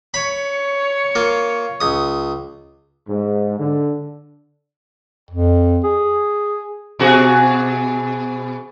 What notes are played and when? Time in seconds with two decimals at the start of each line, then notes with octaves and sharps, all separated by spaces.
0.14 C#5 B5 C#7
1.15 A#3 F4
1.80 C#2 D#6
3.08 G#2
3.60 D3
5.31 F2
5.84 G#4
6.99 B2 F#4 G#4